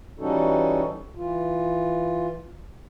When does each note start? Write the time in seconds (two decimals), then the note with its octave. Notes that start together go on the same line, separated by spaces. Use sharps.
0.19 E3 G3 C#4 D#4 F#4 A4
1.17 E3 F4